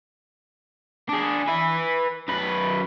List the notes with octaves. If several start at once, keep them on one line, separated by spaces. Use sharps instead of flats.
D4 G#4
B4 E5
F#2 B4